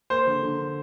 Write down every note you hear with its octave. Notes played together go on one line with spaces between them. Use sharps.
A#3 C5
D3
D3